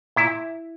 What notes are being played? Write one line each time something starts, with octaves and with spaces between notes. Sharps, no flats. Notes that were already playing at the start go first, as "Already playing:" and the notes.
A#2 E4